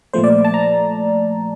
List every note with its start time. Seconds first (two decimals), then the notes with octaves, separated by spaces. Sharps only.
0.13 A#2 F3 A3 C5
0.24 D5
0.45 A5
0.54 A#5